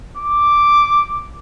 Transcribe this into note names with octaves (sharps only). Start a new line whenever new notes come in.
D6